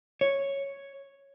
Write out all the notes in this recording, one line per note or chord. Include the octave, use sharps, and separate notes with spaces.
C#5